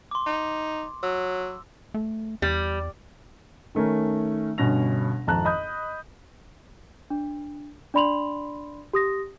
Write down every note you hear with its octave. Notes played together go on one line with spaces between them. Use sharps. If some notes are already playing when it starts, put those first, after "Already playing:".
C6 D6
D#4
F#3 E6
A3
E2 G3
D#3 A3 C#4 A#4
G1 G2 B2 C#4 A#6 F7
G#1 F2 A5 A#5 F#6
D#5 B5 D#6 G6
D4
D4 D5 B5 C6 F7 F#7
G4 D#6 A#6